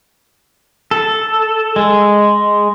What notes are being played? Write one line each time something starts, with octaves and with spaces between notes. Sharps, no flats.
A4
G#3